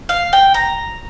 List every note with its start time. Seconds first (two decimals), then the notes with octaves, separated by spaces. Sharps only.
0.09 F5
0.33 G5
0.54 A#5